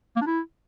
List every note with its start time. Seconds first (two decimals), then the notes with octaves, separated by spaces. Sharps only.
0.16 A#3
0.21 D4
0.26 E4